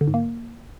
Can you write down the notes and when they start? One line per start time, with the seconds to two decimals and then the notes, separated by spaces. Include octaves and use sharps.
0.01 D3
0.07 G#2
0.14 A#3